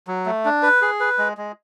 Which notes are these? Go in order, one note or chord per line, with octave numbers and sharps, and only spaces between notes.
F#3
A3
D4
B4
G#4
B4
G#3
G#3